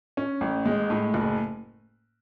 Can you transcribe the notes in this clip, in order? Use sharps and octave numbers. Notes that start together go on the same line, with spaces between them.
C#4
A1
G#3
A2
F#1